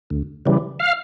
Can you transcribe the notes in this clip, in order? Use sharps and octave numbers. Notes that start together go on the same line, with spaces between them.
D2
C#3 E3 G3
F5